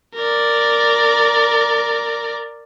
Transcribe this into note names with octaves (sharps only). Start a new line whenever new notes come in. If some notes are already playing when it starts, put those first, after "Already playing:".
A#4 D5